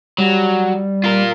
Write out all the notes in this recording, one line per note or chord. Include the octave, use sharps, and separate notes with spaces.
F#3 G3
F4 A#4